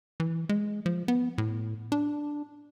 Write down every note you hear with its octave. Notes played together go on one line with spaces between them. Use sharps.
E3
G#3
F3
B3
A2
D4